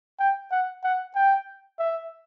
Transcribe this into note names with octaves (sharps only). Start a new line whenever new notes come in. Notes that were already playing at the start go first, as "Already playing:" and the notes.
G5
F#5
F#5
G5
E5